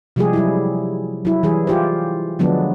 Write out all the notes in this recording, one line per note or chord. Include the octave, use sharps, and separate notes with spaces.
C3 F3 G3 G#3 G4 G#4
F#3 G3 E4
F#3 E4
E3 G3 G#4
F4 G4 C5
D3 F3 F#3 G#3 B3 D4